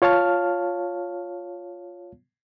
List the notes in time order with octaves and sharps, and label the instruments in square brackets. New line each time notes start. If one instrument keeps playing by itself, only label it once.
[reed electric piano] F4 C#5 F5 A5 F6